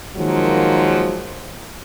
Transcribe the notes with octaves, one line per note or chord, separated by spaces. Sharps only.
D#3 F3 F#3 G#3 A#3